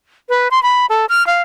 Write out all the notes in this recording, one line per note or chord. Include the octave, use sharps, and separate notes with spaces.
B4
C6
B5
A4
F6
F5